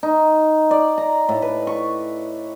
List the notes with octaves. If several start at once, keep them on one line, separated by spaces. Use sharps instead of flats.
D#4
D5
A#5
A2
B4
C#6